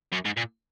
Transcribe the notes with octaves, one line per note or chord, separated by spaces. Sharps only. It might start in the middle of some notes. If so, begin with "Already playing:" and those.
F#2
G#2
A#2